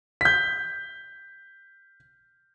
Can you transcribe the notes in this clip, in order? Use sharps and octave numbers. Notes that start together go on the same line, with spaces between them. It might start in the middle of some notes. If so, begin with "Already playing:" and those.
G6 B6